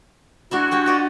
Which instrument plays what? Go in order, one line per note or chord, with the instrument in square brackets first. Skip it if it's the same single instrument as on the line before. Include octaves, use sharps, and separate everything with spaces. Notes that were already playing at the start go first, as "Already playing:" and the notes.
[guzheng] G#3 D4 E4 [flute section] F#4
[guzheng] G#3 G4 G#4
F4 D5 D#5